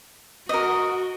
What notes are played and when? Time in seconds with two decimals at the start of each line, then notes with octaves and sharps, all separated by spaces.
0.49 F#4 A#4 D#5